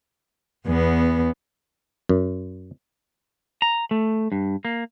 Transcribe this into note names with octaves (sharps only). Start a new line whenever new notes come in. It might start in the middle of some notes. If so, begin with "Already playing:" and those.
E2 B3
F#2
A#5
A3
G2
A#3